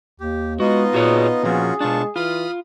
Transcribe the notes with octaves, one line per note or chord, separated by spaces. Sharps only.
D#2 G4
G#3 B3 D#4 F4 F#4 D#5
A#2 F#4 G#4 C#5
A#2 F3 C#4 F4 F#4 G#4
B2 G#3 D4 F4 A5 C#6
E3 F4 B5 D#6 F6